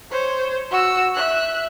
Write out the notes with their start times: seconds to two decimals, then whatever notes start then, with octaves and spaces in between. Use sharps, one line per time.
0.11 C5 C#5
0.71 F#4 E6
1.15 E5 F#6